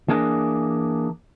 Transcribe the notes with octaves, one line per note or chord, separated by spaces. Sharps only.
E3 A#3 D4 G#4 A#4